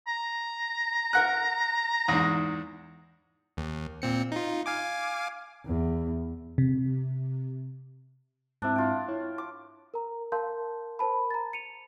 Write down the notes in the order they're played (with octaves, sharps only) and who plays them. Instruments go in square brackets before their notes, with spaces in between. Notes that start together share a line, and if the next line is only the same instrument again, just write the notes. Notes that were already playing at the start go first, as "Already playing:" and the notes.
[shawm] A#5
[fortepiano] A#4 F#5 F#6
E2 G#2
[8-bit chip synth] D#2
A#2 C4 C#7
D#4 F4
F5 G#5 D6
[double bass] E2
[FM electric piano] C3
[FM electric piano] G#2 C4 E4 [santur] D4 E5
[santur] F4 G5
[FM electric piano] E4 C#5
[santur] D6
[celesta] A#4 A#5
A#4 F5 A5 C6 G6
A#4 C5 A5 B5
A#5 A6
C#7 D#7 F7